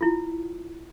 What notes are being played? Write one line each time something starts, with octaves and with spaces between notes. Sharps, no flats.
E4 F4